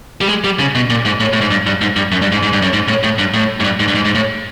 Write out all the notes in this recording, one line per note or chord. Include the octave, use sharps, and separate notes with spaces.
G3
G#3
G3
C#3
B2
A#2
G#2
A2
A2
G#2
G2
G2
G#2
G2
F#2
G2
G#2
G#2
G2
F#2
G#2
A2
A2
G2
A2
G#2
G2
G#2
G2
G#2
G#2
A2